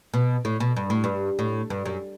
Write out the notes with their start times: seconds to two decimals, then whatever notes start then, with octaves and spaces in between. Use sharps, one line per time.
0.14 B2
0.45 A2
0.60 B2
0.76 G2
0.90 A2
1.04 G2
1.39 A2
1.70 G2
1.85 F#2